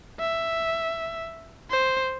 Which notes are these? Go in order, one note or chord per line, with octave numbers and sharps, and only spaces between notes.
E5
C5